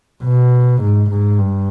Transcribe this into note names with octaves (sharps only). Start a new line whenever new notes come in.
B2
G#2
G#2
G2